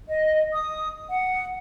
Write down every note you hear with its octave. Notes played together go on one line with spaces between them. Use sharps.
D#5
D#6
F#5